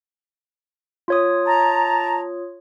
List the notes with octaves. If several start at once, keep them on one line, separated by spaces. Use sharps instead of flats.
F4 C#5 D#6
A5 A#5